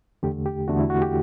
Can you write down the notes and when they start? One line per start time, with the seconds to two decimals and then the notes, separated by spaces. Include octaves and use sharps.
0.23 E2 D3 A3 G4
0.46 G4
0.68 E2 D3 A3 F#4
0.80 E4
0.90 F#4
1.02 G4